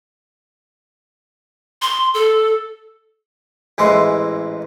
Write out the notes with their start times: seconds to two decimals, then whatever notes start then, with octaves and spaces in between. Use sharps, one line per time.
1.82 C6
2.14 A4
3.78 A1 G#2 E3 G#3 E4 C6